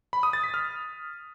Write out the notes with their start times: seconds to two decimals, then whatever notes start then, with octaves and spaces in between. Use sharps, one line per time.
0.13 B5
0.23 D#6
0.33 A6
0.44 B6
0.54 F6